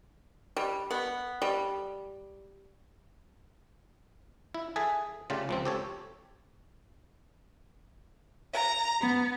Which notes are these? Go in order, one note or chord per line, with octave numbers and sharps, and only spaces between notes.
G3
B3
G3
E4
G#4 A4 E5 G#5
C#3 A3 F4 G4 D5
C#2 F3 C4
G4 A4 C#5
A#5
B3